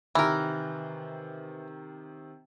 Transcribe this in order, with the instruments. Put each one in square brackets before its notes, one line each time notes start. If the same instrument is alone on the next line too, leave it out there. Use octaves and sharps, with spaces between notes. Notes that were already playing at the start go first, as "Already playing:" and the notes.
[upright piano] C3 D#3 [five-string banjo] E3 A#4